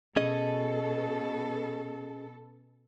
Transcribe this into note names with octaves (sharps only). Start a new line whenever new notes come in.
B2 C#4 G#4 A4 D#5